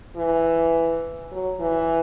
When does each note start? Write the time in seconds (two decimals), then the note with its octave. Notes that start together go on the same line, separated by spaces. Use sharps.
0.16 E3
1.31 F#3
1.60 E3